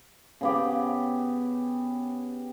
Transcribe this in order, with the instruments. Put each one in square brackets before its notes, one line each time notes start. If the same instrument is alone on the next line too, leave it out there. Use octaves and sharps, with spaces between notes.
[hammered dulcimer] C#3 B3 G4